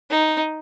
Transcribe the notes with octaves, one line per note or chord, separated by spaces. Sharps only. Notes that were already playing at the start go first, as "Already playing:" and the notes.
D#4